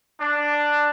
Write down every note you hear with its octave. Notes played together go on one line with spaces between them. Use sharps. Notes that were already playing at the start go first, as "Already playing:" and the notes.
D4